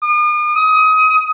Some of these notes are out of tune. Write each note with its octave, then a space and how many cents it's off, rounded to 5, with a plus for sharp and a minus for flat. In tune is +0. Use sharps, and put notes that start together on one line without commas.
D#6 -45
D#6 +25